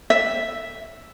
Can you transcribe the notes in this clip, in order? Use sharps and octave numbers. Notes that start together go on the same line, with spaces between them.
E5